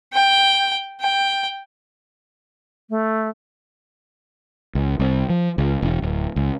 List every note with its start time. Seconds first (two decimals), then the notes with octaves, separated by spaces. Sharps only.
0.14 G5
1.01 G5
2.90 A3
4.75 C#2
4.99 C2
5.29 F3
5.58 C#2
5.82 E1
6.02 D1
6.36 C#2